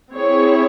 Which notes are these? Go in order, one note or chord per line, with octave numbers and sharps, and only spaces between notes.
C4 E4 G#4 C#5